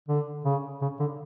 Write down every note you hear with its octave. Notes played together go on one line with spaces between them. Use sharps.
D3
C#3
C#3
D3